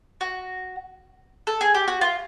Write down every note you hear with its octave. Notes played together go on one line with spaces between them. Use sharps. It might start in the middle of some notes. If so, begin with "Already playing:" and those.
F#4
A4
G#4
G4
F#4
F4